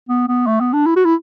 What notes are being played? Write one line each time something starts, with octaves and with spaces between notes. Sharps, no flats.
B3
B3
A3
B3
D4
E4
F#4
E4